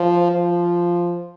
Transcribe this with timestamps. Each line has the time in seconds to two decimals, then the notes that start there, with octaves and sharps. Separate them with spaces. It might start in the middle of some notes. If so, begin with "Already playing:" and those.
Already playing: F3
0.31 F3